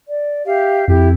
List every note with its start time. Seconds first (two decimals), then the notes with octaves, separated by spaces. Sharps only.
0.09 D5
0.46 G4 E5 F5
0.88 F2 E4 G4